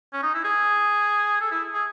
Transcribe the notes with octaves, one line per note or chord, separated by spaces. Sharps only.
C#4
D#4
E4
G#4
A4
E4
G#4